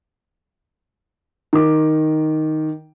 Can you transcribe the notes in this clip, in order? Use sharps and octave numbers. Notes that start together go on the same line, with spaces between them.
D#3 D6